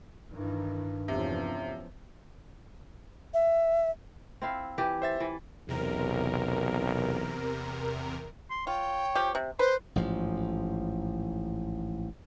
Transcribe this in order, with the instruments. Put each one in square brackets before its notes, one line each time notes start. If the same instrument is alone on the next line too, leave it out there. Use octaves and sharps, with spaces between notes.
[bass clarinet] G2 [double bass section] D#3 E3
[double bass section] E2 F3 C#4 [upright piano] C3
[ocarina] E5
[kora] C4 E4 F5
E3 G4
[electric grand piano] C5 E5 A6
[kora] E3
[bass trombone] B1 [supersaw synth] E2 C3 A#4
[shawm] C6
[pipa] F4 [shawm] C#5 [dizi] G5
[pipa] F3 G4
C3
[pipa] B4 [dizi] C5 [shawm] C6
[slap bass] A1 G#2 F3